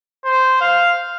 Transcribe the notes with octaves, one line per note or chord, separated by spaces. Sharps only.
C5
F5